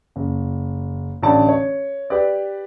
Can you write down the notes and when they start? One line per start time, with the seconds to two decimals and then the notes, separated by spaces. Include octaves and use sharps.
0.16 F#1
1.22 A1 D3 D5 A5
1.49 C#5
2.10 G4 B4 D5